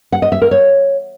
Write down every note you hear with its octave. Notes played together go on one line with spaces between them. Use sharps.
F#5
D#5
E5
A#4
C#5